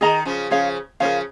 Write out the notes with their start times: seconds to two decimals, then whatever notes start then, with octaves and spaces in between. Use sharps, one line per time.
0.01 D#3 G#4 D#5 A#5
0.25 C#3 F3
0.50 C#3 F3 G#4 C#5 F5
1.00 C#3 F3 A#4 C#5 F5